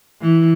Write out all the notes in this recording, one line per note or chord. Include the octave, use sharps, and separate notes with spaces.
E3